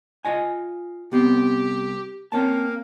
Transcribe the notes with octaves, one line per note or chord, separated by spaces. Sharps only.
F4 D#5 G#5
C2 B3 C4 G4
A#3 C4 C#4 A5